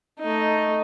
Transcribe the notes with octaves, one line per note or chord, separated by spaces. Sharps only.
A3 D#4